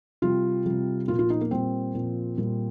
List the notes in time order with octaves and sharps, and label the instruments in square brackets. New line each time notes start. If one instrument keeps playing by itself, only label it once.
[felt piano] C3 G3 F4
C3 G3
A#2 F3 F4
F4
D#4
A#3
A#2 G3 C4
A#2 F3
A#2 G3